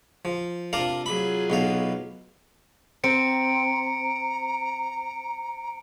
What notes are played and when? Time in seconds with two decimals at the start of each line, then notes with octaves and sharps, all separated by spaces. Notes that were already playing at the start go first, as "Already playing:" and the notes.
0.25 F3
0.73 C3 D4 F4 A#4 F5
1.06 F#3 F4 G#4 B5
1.50 B1 B2 F5
3.04 C4 A#5 C#7 D7